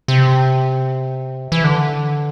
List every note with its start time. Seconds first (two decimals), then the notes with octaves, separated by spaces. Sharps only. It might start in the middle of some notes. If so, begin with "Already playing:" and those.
0.08 C3
1.52 E3
1.64 D3